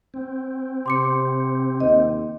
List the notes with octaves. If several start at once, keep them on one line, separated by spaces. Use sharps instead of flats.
C4
C3 C6 D6 C#7
D#2 D#5